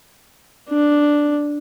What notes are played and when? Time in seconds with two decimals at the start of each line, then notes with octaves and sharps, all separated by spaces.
0.69 D4